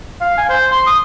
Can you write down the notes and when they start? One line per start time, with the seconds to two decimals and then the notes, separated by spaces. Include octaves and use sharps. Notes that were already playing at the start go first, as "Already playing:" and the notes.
0.21 F5
0.38 G#5
0.49 C5
0.71 C6
0.87 D#6